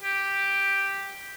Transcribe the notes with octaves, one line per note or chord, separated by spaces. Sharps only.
G4